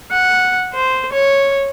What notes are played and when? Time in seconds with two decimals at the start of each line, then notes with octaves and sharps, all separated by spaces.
0.11 F#5
0.74 C5
1.12 C#5